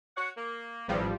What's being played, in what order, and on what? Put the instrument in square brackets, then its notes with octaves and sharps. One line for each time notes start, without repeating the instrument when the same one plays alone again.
[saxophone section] F#4 C#5 F#5
A#3
[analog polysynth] A1 F3 G3 [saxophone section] E2